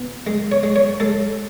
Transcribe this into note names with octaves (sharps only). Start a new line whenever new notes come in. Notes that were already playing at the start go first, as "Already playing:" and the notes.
Already playing: B2
G#3
C#5
G#3
C#5
G#3 A4